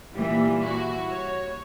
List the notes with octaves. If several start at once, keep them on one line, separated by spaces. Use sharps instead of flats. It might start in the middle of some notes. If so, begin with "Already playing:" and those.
A#2 E3 G3
E4 F#4
C#5